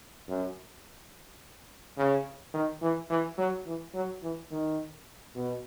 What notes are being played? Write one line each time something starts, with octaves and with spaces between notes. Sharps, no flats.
F#2
C#3
D#3
E3
E3
F#3
E3
F#3
E3
D#3
B2